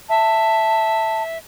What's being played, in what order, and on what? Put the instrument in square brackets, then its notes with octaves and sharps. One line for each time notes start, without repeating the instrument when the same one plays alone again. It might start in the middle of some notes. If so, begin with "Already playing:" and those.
[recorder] E5 [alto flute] A5